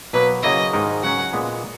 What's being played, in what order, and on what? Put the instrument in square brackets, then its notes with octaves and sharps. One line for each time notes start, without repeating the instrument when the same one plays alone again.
[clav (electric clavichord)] B2 F#3 A#3 [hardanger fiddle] B4
[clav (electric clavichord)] C#3 F#3 A#3 E4 [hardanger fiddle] D#5
[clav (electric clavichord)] G#2 D#3 G#3 D#4 A#4
[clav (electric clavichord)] C#3 F#3 C#4 [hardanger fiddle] F#5
[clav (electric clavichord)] A#2 G#3 B3